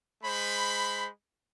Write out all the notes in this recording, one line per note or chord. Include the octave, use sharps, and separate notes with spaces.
G#3 C5 B5